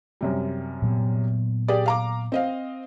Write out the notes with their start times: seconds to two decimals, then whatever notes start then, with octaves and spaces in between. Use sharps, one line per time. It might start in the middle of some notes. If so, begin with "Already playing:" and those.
0.21 F#2 C3 G3
0.82 A#2 F#3 B3
1.68 G4 G#4 D5
1.86 F5 A#5 D6
2.32 C4 D#5 F5